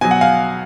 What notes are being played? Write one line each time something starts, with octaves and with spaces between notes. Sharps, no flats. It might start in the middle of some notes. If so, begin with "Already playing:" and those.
B2 F#3 G#5
F#5
F5 G#5